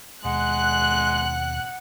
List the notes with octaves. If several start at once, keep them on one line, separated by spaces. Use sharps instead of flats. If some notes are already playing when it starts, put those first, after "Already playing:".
D#2 B2 G#3 F#5 F#6